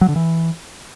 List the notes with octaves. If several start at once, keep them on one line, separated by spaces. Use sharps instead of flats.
F#3
D3
E3